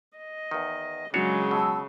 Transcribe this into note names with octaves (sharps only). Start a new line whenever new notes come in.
D#5
E2 D#3
C#3 F#3 G#3 D4 F#4 C#5
B2 A5 E6